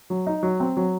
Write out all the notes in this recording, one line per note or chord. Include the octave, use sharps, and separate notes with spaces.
F#3
D#4
F#3
C4
F#3